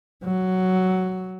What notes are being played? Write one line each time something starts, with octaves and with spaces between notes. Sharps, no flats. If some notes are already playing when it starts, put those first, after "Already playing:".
F#3